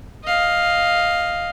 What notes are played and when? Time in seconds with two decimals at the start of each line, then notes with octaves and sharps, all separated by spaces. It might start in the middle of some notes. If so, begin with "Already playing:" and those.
0.24 D#5 F5